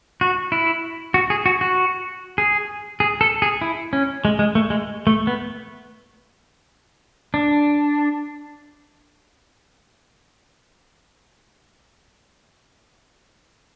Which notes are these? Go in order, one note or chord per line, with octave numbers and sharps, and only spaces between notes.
F#4
E4
F#4
G#4
F#4
F#4
G#4
G#4
A4
G#4
E4
C#4
G#3
G#3
A3
G#3
A3
B3
D4